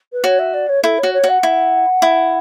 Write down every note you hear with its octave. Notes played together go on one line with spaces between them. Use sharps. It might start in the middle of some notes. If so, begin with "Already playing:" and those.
B4
F#4 C#5
E5
D5
C#5
E4 A4
F#4 C#5
C#5
F#4
F#5
E4
E4